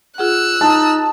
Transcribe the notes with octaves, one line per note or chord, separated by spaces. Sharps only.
F4 G#4 F#5 E6 F#6
D#4 A5